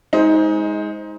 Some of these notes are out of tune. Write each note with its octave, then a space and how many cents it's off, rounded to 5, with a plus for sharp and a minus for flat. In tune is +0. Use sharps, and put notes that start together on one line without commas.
G#3 +0 D#4 +25 C5 +0